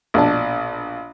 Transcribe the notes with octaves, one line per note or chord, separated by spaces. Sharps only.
A#1 B2 D4 A5